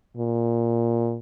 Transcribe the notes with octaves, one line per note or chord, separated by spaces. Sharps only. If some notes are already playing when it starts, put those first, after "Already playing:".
A#2